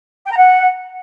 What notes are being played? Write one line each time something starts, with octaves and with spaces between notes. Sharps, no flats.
G5
A#5
F#5